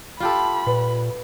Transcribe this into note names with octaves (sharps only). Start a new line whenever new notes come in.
F4 G4 A4 B5
A#2 B4